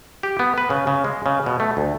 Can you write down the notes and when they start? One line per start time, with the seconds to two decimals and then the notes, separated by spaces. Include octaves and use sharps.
0.23 G4
0.39 B3
0.58 B4
0.70 C#3
0.87 C#3
1.04 G#3
1.26 C#3
1.46 B2
1.60 A3
1.77 D2